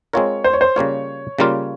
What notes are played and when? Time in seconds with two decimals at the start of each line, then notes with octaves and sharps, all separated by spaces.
0.13 G#3 C4 F4 A#4 C#5
0.44 C5
0.53 C#5
0.61 C5
0.76 C#3 G3 A#3 F4 C#5
1.39 C#3 G3 A#3 F4